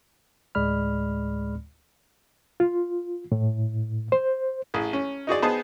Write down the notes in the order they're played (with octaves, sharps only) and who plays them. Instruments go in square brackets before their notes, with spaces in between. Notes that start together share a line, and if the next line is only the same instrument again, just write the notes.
[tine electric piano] D2 A2 G#3 D5 B5 F6
[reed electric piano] F4
A2
C5
[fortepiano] A1 G#4
C#4
D#4 F#4 G#4 D5
B3 D#4 G#4 C5 A5